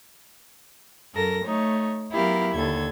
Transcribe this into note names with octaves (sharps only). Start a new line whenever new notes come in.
F#2 A4 A#4 A#6
A3 D#4 C#5
F#3 B3 E4 G4 A#4 F5
D#2 D3 A4 G#6